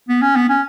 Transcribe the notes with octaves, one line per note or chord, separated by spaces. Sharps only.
B3
C#4
B3
C#4